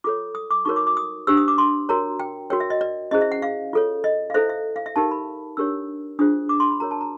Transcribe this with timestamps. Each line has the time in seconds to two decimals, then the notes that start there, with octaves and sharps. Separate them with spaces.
0.04 F4 A4 C#5 D6
0.35 D#6
0.51 D6
0.65 D#4 F#4 A#4 C#5 C#6
0.76 D6
0.87 D6
0.97 D#6
1.27 D4 G4 C5 E6
1.37 D#6
1.48 D6
1.58 C6
1.89 F#4 A#4 C#5 A#5
2.20 G5
2.50 F#4 A#4 C#5 G5
2.60 E5
2.70 D#5
2.81 D5
3.11 C#4 E4 G#4 C5 D#5
3.21 E5
3.32 F#5
3.42 F5
3.73 F4 A4 C#5
4.04 D#5
4.30 F5
4.34 E4 A4 C5 E5
4.49 E5
4.76 F5
4.86 E5
4.96 D#4 G4 A#4 A5
5.11 B5
5.57 D4 G4 A#4 C#5 E6
6.19 D4 F4 G#4 C5 D#6
6.49 D6
6.60 C6
6.71 B5
6.80 F#4 A#4 C#5 A#5
6.91 A5
7.01 A#5